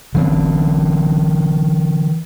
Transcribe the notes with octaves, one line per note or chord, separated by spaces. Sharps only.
D3 E3 C4